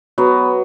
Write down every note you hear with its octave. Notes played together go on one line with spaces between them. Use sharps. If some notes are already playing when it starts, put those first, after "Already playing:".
F#3 B3